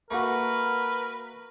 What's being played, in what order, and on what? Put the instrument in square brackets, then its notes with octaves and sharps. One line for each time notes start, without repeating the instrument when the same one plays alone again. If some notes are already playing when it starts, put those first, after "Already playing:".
[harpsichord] A3 A#3 F#4 [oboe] A#4 [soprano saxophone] B4